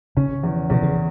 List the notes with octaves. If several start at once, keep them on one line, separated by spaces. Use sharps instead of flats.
C#3 C#4
E2
E2 B2
C#3